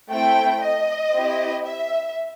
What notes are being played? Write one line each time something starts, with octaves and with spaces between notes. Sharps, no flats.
A3 C4 E4 G5
D#5
C4 E4 G4
E5